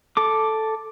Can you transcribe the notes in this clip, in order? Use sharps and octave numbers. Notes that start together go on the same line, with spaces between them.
A4 D6